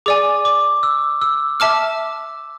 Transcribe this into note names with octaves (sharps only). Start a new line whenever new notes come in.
G#4 D5 G#5 D6
D6
E6
E6
E5 A5 D6 F6